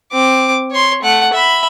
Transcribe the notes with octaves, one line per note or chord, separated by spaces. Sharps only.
C4 D6
C#5 C6
A3 F#5
E5 B5